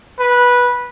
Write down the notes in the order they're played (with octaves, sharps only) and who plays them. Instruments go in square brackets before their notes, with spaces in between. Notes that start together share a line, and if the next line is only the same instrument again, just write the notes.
[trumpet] B4